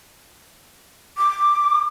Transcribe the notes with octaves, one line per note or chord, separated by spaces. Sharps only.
D6